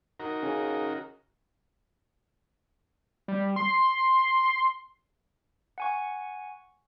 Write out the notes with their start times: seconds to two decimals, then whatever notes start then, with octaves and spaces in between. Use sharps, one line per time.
0.20 D#4 F#4 A#4
0.43 C#3
3.28 G3
3.56 C6
5.78 F#5 G#5 C#6